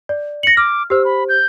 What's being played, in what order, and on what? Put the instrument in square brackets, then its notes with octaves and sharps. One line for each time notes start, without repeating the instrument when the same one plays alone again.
[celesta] D5
[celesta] A#6 F#7 [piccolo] C#7
[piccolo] D6 [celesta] F6
[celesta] G4 C5 [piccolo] E6
[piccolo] B5
G6